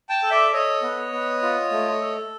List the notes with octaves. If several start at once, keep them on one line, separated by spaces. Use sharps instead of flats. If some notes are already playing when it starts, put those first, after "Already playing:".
G5 A5
A4
D5 E5
A4 C#5 D#5
B3
B3
F4
A3
A4